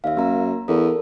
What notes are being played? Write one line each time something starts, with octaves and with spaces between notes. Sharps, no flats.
D#2 E5 F5
F#2 A#3 A#5
E2 A4 A#4